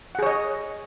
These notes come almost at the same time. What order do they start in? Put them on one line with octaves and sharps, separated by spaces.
F#5 G#4 C#5 D#5